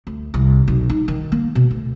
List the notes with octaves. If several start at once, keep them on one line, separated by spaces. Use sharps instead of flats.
D2
C2
B1
D#4
D#3
A#3
B2
D2